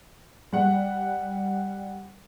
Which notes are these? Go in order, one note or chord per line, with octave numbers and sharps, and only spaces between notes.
G3 F#5